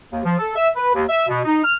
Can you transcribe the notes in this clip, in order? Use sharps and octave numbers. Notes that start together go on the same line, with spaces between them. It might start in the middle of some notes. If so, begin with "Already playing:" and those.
D#2
F3
A4
E5
B4
D#2
E5
B2
D#4
F6